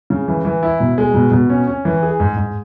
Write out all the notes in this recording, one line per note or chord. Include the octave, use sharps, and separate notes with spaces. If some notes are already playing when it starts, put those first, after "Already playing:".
C#3
E3
E3
E4
B2
G#3
B2
B2
C#4
C#4
E3
G#4
G#2
G#2